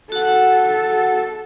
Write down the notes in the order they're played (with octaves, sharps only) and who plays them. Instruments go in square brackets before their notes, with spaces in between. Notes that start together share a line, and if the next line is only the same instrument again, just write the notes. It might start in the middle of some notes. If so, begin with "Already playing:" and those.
[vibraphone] F#4 F#5 [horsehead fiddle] A4